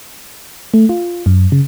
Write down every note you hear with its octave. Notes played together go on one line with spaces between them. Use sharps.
A3
F4
F#2
C#3